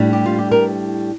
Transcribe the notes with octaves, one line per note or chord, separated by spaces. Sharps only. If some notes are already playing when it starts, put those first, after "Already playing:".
Already playing: A2 G3 D4
G4
F4
G4
A#4